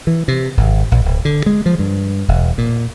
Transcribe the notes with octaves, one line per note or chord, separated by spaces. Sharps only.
E3
C3
G#1
A#1
D1
D3
G#3
F3
G2
E1
A#2